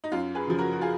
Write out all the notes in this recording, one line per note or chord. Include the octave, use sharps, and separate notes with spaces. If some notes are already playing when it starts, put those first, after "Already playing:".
D#4
F#2 F4
G#4 B4
C#3 F3
F#4 A#4
F#4
F4 G#4